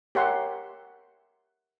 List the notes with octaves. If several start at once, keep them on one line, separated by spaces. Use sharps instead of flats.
G4 A#4 C#5 E5 F#5 C6